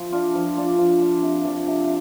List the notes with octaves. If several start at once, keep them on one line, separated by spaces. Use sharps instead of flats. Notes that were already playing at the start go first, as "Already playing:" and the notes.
Already playing: F3
D4 F4
F3
D4 F4
F3
D4 F4
C3
F3 D4
C3